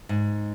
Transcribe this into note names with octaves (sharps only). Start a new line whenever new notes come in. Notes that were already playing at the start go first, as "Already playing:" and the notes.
G#2